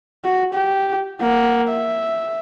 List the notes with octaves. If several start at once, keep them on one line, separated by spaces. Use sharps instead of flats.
F#4
G4
A#3 F#5
E5